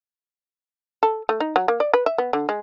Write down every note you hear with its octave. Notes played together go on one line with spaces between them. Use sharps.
A4
A3
D#4
F#3
A#3
D5
B4
E5
B3
D3
G#3